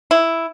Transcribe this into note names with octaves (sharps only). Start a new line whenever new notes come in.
E4